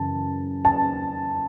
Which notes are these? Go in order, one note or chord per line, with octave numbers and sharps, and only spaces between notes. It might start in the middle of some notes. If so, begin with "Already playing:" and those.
Already playing: F#2 C#3 E3 A5
A5